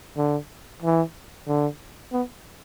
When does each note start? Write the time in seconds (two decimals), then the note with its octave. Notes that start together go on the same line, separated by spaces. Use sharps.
0.17 D3
0.82 E3
1.47 D3
2.12 B3